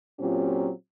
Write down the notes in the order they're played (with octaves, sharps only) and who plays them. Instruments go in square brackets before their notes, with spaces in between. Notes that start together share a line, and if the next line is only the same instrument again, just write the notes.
[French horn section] A#2 F#3 C4 C#4 F4 G4